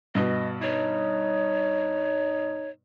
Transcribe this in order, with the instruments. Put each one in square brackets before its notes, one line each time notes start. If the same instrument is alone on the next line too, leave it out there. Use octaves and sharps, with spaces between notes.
[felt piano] G2 B2 [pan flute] D#5
[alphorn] D#4 [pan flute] C#5